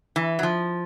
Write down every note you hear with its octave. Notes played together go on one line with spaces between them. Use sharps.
E3
F#3
F3